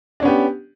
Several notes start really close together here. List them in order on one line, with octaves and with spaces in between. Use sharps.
D4 C#4 B3 G4